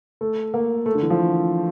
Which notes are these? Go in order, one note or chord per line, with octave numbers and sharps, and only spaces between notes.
A3
A#3
A3
D3
E3
F3